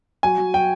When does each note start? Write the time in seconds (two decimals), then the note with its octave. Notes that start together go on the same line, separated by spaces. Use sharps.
0.23 F#3 G#5
0.38 F#3
0.54 F#3 G5